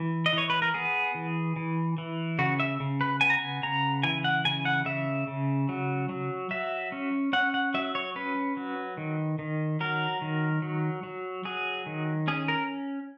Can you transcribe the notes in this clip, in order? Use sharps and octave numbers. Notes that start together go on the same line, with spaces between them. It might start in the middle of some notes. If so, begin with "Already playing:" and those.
Already playing: E3
D#5
E3 C#5
B4
A#4
B3 G#4
E3
E3
E3
C#3 F#4
E5
C#3
B4
B3 G#5
A#5
G#5
C#3 A#5
E3 G#5
F#5
C#3 G#5
F#5
C#3 E5
C#3
F#3
F#3
F#3 E5
C#4
C#4 F#5
F#5
F#3 E5
C#5
C#4 B4
F#3
D#3
D#3
F#3 A#4
D#3
F#3
F#3
F#3 G#4
D#3
C#4 G#4
A#4